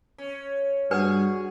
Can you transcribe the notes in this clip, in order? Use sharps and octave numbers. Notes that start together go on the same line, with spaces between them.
C#4
G2 F#4 G#4 B4 D5